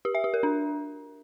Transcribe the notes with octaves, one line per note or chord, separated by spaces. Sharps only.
G4
E5
G4
A#4
D4